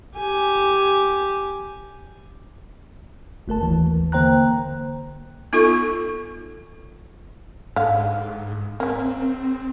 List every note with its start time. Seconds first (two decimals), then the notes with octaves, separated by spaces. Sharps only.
0.17 G4 G#5
3.48 G1 A3 A#4 A5
3.61 D#2 E3
4.12 D3 A#3 C5 G5 A#5 F#6
5.53 B3 D#4 F4 A4 C#6
7.76 G#2 D3 F5
8.80 C#3 A#3 C4